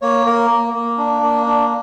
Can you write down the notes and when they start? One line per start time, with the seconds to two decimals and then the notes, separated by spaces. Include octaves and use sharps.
0.02 A#3 C#5
0.26 A#3 A#4
0.50 A#3
0.74 A#3
0.98 D4
1.23 A#3
1.46 D4